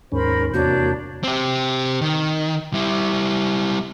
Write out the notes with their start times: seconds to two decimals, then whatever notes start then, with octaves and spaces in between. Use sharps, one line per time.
0.12 D#2 G#2 C#4 A#4 C5 B5
0.54 E2 C3 A#3 D4 F#4 C#5 G6
1.24 C4 G4
2.01 D#3
2.73 G3 E4